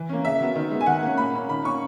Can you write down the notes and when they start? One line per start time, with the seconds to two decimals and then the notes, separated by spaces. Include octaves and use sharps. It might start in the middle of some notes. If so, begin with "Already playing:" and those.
Already playing: E3
0.09 A#3 C#4
0.24 C#3 E5
0.41 F#3 B3
0.55 D#3
0.71 G#3 B3
0.81 G#5
0.86 D#3 F#5
1.02 A#3 C#4
1.17 A#2 B5
1.34 A#3 C#4
1.49 D#3 B5
1.65 A#3 C#4 C#6